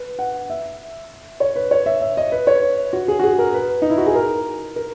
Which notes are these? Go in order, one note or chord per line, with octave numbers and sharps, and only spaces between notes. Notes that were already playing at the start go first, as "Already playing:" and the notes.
Already playing: B4
F#5
E5
C#5
B4
C#5
E5
E5
D#5
B4
C#5
F#4
G#4
F#4
G#4
A#4
B4
D#4
E4
F#4
G#4
A#4
A#4